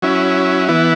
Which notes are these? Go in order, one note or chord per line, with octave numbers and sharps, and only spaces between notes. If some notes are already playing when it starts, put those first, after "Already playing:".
F#3 C#4 E4
E3 B3 E4